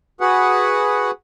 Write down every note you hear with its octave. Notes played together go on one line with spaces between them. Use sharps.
F#4 G#4 B4 F#5